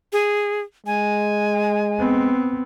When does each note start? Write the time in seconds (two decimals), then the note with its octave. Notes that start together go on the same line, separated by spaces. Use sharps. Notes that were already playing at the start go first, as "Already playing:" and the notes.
0.13 G#4
0.86 G#3 G#5
1.99 B3 C4